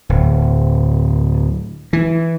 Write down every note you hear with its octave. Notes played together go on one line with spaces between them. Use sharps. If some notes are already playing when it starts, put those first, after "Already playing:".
D1
E3